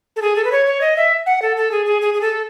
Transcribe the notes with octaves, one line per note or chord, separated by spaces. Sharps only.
A4
G#4
A4
B4
C#5
C#5
D#5
E5
F#5
A4
A4
G#4
G#4
G#4
G#4
A4